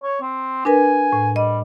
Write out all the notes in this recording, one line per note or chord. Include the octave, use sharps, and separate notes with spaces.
C#5
C4
D4 A#4 B4 G#5
A2
G3 D#5